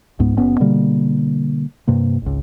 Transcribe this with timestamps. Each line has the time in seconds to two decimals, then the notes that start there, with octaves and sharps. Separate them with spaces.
0.19 C#2 G#2 B3
0.37 F#1 B3 C#4
0.60 B2 D3 G3 A#3
1.88 G2 C3 A#3
2.22 G#1 C#2